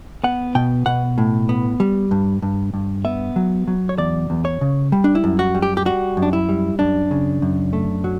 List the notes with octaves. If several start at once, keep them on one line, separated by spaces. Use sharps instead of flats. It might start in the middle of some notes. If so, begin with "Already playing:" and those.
B3 F#5
B2 G5
B2 F#5
A2
B3
G3
G2
G2
G2
B3 E5
F#3
F#3
C#5
E2 D5
E2
C#5
C#3
G3
D4
E4
F#2
F#4
G3
G4
G4
G3 F#4
F#2
D4
E4
G3
F#2 D4
C#3
F#2
A3
F#3